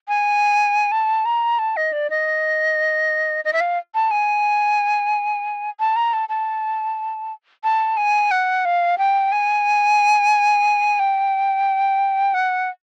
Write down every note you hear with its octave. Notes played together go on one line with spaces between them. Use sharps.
G#5
A5
A#5
A5
D#5
D5
D#5
D#5
E5
F5
A5
G#5
A5
A#5
A5
A5
A5
G#5
F#5
F5
G5
G#5
G5
F#5